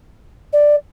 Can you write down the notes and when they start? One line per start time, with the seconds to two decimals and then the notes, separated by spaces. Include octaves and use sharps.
0.52 D5